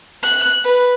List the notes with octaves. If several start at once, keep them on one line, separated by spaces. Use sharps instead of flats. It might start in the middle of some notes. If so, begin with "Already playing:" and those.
F#6
B4